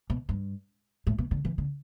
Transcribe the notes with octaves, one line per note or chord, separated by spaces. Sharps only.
B2
G2
A2
B2
D3
E3
D3